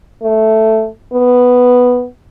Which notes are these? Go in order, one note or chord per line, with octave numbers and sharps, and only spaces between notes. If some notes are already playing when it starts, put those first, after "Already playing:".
A3
B3